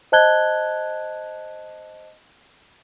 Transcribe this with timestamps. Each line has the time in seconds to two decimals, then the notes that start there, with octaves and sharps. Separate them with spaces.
0.12 C5 D#5 A5 F#6 G#6 G7